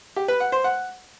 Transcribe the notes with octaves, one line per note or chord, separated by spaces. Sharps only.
G4
B4
F#5
C5
F#5